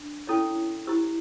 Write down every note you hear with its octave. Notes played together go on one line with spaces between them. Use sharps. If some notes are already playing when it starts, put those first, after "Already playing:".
Already playing: D4
C#4 E4 A4 C#5
E4 G4 C5 E6